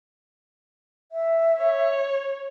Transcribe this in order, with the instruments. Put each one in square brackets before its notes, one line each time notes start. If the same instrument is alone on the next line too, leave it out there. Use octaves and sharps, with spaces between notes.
[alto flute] E5
[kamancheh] C#5